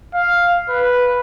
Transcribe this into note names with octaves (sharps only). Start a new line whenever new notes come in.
F5
B4